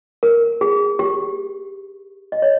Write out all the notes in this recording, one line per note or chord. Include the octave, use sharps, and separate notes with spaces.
A#4
G#4
G4
D#5
C#5